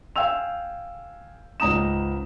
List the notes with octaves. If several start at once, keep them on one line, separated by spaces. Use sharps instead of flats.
F5 G5 G#5 E6 F7
C#2 G#2 A#5 D#6 E7